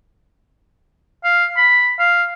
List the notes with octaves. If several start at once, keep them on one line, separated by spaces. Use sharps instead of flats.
F5
B5
F5